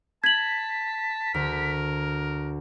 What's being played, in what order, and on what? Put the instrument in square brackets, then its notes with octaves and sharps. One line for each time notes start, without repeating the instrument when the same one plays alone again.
[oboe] A5 [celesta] G#6 F#7 [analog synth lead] B6
[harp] D2 [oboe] A#4